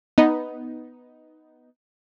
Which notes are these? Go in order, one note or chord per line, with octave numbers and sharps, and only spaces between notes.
B3 D#4